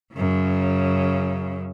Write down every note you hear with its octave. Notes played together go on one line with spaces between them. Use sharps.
F#2 C#3